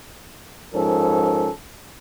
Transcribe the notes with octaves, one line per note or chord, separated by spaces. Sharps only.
G#2 F3 C#4 A4 A#4